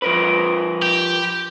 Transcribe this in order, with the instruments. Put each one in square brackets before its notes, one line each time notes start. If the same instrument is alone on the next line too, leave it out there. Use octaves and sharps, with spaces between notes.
[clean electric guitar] F3 A#4 B4
[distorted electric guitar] G4